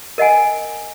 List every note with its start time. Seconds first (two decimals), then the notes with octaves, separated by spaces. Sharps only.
0.18 A#4 D#5 F#5 G#5